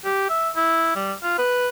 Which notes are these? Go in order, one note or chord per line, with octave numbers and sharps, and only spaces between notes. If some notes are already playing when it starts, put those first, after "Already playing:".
G4
E5
E4
G3
F4
B4